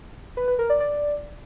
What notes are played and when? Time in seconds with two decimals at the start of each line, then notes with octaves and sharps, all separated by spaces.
0.37 B4
0.48 B4
0.59 A#4
0.70 D5
0.80 D5